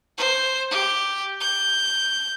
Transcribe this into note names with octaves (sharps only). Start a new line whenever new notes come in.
C5
G4
G6